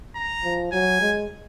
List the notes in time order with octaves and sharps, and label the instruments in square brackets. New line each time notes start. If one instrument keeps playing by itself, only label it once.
[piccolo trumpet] A#5
[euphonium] F3
[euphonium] F#3 [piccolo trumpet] G#5
[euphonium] G#3